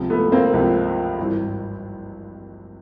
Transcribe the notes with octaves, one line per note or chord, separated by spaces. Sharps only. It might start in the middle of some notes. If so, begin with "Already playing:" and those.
Already playing: C#2 C3 F3
A3 B3
A#3 C4
C#2 C3 F3
G#1 G2 E3